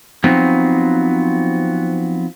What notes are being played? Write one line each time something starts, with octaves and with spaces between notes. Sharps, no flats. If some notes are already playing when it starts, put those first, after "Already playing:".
F3 F#3 B3 C4 D#4